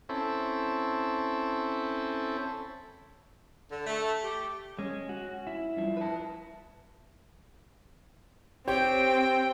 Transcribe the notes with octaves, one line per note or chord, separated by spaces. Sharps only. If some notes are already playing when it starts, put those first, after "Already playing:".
C4 C#4 E4 A4
D3
A3
G4
G#3 C#4
F#4
E4
G2 F3
B4 A5
C4 G4 C5 C#5 G5